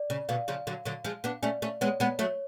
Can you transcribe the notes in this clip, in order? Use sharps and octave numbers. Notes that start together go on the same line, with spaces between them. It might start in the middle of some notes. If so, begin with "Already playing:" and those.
Already playing: D5
C#3
B2 D3 F5
C#3 F3
D3 F#3
D3 F#3
F3 G#3
B3 D4
A3 C#4 D5
A3 C#4
G#3 B3 C#5
G#3 B3
F#3 A3 C#5